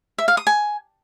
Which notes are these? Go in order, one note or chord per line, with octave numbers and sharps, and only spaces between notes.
E5
F5
D#6
G#5